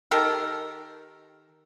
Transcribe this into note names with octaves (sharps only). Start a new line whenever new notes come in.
D#3 G4 A4 A#4